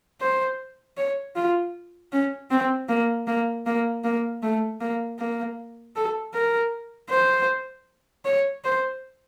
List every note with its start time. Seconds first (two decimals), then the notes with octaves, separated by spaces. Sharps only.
0.21 C5
0.97 C#5
1.36 F4
2.12 C#4
2.51 C4
2.89 A#3
3.27 A#3
3.66 A#3
4.04 A#3
4.43 A3
4.81 A#3
5.19 A#3
5.96 A4
6.34 A#4
7.10 C5
8.25 C#5
8.64 C5